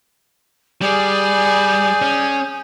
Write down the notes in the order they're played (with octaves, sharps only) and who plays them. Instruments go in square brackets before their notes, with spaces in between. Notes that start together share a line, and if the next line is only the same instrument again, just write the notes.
[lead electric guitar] G3 [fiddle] G#4 D5 [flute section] G#5 D#6 G6
[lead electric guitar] C#4